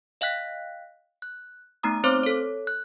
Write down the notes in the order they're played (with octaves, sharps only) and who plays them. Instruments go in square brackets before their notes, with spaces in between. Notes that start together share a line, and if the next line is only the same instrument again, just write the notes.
[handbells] D#5 F5 G5 F#6 B6
F#6
A3 B3 D#4 A#5 D#6
C4 C5 C#5 C6 D6 F6
A4 C#5
F#6